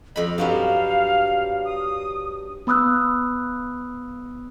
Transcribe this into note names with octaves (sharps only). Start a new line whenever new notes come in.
F2 D#5 B5
G2 F#3 G3 F5
D#6
B3 B5 D#6 E6 F#6